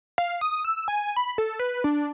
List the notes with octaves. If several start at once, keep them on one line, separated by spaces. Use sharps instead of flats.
F5
D#6
E6
G#5
B5
A4
B4
D4